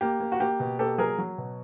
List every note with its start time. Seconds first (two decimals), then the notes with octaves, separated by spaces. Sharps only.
0.01 A#3 G4
0.20 A#3
0.32 F#4
0.40 A#3 G4
0.60 B2
0.79 A#3 G4 A4
0.98 F#3 G#4 A#4
1.18 F#3
1.38 B2